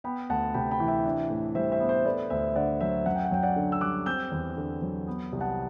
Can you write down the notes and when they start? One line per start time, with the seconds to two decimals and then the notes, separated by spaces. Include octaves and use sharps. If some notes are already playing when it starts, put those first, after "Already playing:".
0.04 B3 G5 B5
0.29 D2 F#5 A5
0.54 C3 G5 B5
0.71 G5 B5
0.80 E3
0.88 E5 G5
1.05 D4
1.30 A2
1.55 G3 C5 E5
1.72 C5 E5
1.80 B3
1.89 C5
2.05 A3 B4 D5
2.30 D2 C5 E5
2.56 D3 D5 F#5
2.80 F#3 C5 E5
3.06 F#2 F#5
3.16 G5
3.25 F#5
3.31 F#2 G5
3.43 D5 F#5
3.56 D3
3.72 E6
3.81 G3 D6 F#6
4.06 C4 E6 G6
4.31 E2
4.57 D3
4.82 F#3
5.07 B3
5.32 C2
5.40 F#5 A5